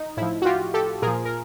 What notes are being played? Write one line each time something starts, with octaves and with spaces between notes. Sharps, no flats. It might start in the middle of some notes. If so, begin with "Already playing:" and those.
Already playing: D#4
A2 F3 E4
F#4
F4 G4
G4 A4
A#2 F3 G#4 A#4
A#4